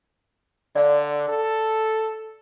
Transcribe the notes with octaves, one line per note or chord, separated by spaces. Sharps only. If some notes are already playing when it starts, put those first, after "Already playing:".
D3 D5 F5
A4